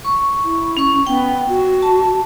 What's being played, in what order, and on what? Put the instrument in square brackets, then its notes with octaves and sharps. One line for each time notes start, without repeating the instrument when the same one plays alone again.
[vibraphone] C#6
[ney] E4
[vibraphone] C#4 C#6
[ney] B3 [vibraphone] G5
[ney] F#4
[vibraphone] A5